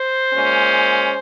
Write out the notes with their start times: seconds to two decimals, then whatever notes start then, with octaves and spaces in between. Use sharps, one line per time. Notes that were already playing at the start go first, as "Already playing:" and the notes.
Already playing: C5
0.32 A#2 G#3 C#4